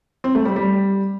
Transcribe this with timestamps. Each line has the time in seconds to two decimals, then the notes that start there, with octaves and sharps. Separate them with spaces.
0.24 C4
0.35 A3
0.45 G3
0.56 G3